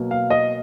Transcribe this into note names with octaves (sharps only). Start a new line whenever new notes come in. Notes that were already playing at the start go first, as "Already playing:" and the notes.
Already playing: B2 F#3 A#3
F5
D#5